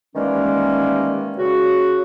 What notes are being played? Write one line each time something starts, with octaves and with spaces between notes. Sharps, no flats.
D#3 E3 G3 G#3 A#3 C#4
C#3 F#4